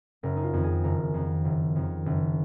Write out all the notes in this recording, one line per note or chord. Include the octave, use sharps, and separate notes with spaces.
F#1 A#4
D#4
F4
F2 D#3
G#4
F#1 A#4
F2 D#3
F#1
F2 D#3
F#1